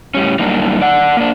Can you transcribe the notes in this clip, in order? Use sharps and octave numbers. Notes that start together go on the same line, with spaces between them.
A2 G3 C#4
F#2 G3 A#3 D4 D#4
D5 F#5
A#3 D4